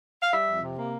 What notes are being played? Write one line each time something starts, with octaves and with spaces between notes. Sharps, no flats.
F5
G3 E5
F2
C3
A#3